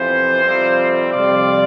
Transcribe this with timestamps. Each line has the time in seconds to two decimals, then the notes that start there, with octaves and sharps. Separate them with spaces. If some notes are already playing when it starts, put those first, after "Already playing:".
Already playing: F2 C3 E3 B3 F4 C5
0.42 F2 C3 G3 C4 F4
1.12 F2 C3 G3 C4 F4 D5